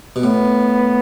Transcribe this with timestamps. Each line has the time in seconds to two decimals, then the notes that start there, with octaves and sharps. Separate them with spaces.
0.16 B2
0.23 A2 B3